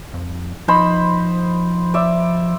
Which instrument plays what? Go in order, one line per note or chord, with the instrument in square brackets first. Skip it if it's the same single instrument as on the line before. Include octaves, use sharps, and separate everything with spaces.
[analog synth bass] F2
[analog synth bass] F3 [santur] D#4 C5 B5
[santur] D5 E5